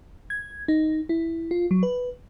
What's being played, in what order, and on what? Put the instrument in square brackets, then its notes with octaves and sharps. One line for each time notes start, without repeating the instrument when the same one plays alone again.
[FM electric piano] G#6
D#4
E4
F4
F#3
B4